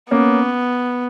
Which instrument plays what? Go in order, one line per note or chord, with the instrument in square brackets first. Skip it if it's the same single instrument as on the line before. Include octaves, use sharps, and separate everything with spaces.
[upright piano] A#3 C#4 [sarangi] B3